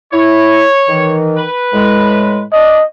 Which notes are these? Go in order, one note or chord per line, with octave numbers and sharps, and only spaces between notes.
E4 C#5
D#3 E3
B4
A2 G#3
D4 D#5